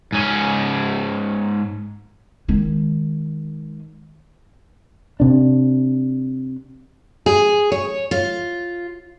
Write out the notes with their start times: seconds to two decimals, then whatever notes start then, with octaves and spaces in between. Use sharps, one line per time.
0.12 G#2 C#4
2.48 D#3 G#3
5.20 C3 D4
7.26 G#4
7.72 C#5
8.11 F4